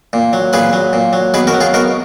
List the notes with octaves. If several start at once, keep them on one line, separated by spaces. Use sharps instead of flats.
A#2
F#3
A#2 G#4 B4
F#3
A#2
F#3
B2 G#4 B4
F#4 A#4
F#3
F4 G#4
B2 F#4 A#4